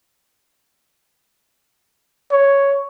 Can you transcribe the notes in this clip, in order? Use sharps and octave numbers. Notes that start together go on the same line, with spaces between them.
C#5